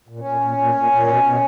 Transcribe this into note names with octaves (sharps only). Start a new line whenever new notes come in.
A#2
C#4
A#2
A#2
A#2
A#2
A#2
B2
B2